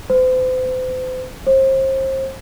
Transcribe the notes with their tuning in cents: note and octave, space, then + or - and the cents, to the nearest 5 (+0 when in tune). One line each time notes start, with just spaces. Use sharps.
C5 -40
C5 +30